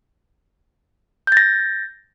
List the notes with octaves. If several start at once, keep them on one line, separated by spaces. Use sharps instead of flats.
G6 A6 A#6